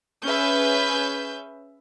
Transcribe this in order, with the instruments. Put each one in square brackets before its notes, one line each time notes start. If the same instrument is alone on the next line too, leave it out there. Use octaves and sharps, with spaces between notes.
[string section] C#4 G#4 B4 E5 G6